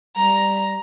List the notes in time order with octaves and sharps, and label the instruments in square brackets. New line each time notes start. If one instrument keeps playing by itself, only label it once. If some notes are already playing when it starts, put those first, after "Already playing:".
[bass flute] G3 [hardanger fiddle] A#5